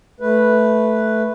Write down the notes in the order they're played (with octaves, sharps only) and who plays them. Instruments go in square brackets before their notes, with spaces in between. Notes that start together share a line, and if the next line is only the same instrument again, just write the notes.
[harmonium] A3 B4